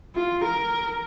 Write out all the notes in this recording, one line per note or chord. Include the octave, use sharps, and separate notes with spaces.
F4
A#4